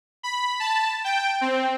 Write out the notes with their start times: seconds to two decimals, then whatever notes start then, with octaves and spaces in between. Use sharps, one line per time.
0.23 B5
0.60 A5
1.04 G5
1.41 C4